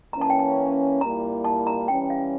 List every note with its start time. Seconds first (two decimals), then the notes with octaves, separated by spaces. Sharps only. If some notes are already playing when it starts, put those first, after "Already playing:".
0.13 E3 A#3 C#4 A#5
0.21 A5
0.30 G5
0.39 A5
1.01 A#2 G3 A#3 E4 A#5
1.44 A5
1.67 A#5
1.88 E3 G3 C#4 G5
2.10 F5